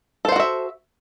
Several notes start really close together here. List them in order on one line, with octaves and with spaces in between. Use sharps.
A4 C5 F#5 F#4 E5